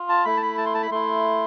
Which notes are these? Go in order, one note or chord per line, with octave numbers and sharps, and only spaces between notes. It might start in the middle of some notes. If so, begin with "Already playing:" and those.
Already playing: F4
A5
A3 E4 B5
A5
B5
A5
C6
A5
B5
A3 E4 C6